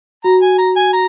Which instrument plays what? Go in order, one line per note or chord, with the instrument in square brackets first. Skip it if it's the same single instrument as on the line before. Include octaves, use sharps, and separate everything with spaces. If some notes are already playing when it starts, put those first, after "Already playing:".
[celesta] F#4 [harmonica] A#5
[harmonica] G#5
A#5
G#5
A#5